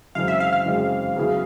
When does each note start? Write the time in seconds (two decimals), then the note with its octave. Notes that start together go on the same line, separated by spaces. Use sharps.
0.15 F#2 C#3 E3 G#3 C4 F5
0.28 E5
0.40 F5
0.53 F5
0.65 F#2 C#3 E3 G#3 C4
1.16 C#3 F#3 B3 E4 G#4